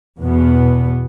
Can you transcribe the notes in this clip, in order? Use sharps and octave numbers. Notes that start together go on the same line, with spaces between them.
E2 B2 B3